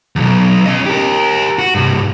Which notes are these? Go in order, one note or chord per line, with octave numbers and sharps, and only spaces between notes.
B1 E2
C#4 D#5
G4 A#4
F#4
C2 G2